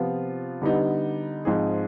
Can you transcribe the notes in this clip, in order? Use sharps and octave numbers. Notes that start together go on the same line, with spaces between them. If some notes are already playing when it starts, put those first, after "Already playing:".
Already playing: C3 F3 B3 F4
D3 G3 B3 D#4
G#2 F3 C4 D#4 G#4